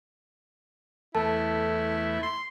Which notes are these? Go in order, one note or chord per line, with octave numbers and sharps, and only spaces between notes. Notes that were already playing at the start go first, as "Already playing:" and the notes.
E2 A3 E4 A4 A5
C6